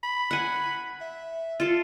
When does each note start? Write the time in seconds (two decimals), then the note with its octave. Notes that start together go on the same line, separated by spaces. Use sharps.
0.03 B5
0.31 F#5 G#5
1.01 E5
1.60 F4 A4